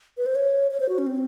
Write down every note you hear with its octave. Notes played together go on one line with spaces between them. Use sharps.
B4
C5
C#5
C#5
C5
F#4
C#4
C4